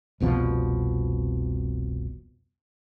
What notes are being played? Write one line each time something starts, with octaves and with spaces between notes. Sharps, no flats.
F1 C2 B2 F3